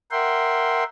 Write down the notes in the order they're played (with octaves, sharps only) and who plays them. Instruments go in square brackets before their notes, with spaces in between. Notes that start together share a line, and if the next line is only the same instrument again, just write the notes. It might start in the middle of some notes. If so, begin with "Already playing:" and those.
[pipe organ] A#4 E5 F#5 G5 C6